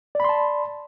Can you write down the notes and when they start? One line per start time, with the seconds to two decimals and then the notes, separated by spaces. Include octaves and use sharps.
0.15 D5
0.20 B5
0.24 C6
0.29 A5